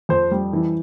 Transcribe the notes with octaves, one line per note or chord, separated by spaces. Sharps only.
F2 C5
G3
E3